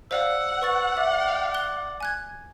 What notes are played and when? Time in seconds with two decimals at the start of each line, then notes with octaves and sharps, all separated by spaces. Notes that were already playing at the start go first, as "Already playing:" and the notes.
0.11 C5 D5 F5 F#5 E6
0.62 B4 C#6 A6
0.97 D5 E5
1.54 F#6 G7
2.00 G#5 F#6 G#6